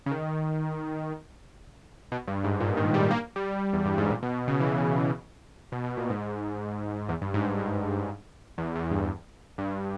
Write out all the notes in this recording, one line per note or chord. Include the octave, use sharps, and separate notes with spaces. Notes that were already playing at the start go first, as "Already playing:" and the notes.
C#3
D#3
B2
G2
G#2
A#2
D#3
G3
A#3
G3
E2
G2
G#2
A#2
B2
C#3
E3
B2
B2
A#2
G#2
E2
G2
G#2
G#2
G2
E2
E2
G2
G2